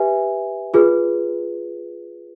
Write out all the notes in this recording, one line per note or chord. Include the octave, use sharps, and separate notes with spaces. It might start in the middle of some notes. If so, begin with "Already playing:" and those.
Already playing: G4 B4 E5 G#5
F4 G#4 B4